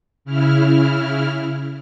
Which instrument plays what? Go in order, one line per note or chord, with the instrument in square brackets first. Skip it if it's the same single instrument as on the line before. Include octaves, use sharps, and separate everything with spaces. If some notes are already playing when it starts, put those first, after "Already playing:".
[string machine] C#3 E4 F6